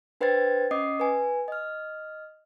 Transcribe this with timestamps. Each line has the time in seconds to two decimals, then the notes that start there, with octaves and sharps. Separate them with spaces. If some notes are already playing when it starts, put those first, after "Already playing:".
0.21 D4 B4 C5 G5 G#6 A6
0.71 C#4 D#5 D6 D#6 C7
1.00 B4 G#5
1.48 D#5 F6